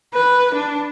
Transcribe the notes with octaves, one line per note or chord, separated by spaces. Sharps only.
B4
D4